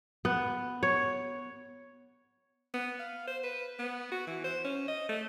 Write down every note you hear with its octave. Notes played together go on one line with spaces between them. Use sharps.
B3
C#5
B3
F5
C5
B4
B3
F#4
E3
C5
C#4
D#5
A3